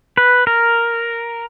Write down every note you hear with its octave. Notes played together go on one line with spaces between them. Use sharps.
B4
A#4